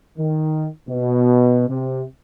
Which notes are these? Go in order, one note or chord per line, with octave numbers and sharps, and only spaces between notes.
D#3
B2
C3